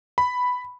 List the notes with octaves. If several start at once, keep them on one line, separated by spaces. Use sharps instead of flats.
B5